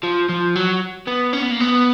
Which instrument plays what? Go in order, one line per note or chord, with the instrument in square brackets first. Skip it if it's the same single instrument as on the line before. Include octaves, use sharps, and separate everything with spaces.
[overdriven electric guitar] F3
F3
F#3
B3
C#4
B3
A#3
B3